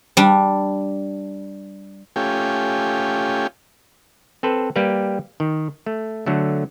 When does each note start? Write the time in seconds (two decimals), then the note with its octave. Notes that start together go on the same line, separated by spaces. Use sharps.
0.17 G3 D4
2.16 A3 C#4 F4 G4 G5 G#5
4.43 C4 A4 B4 C5
4.76 G3 A#3 G4 B4
5.40 D#3
5.86 A3
6.26 D3 F#3 A3